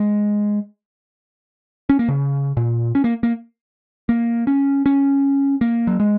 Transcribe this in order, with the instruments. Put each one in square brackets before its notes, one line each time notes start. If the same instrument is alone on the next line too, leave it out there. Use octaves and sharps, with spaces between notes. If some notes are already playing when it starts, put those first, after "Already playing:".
Already playing: [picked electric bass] G#3
C#4
A#3
C#3
A#2
C#4
A#3
A#3
A#3
C#4
C#4
A#3
F#3
G#3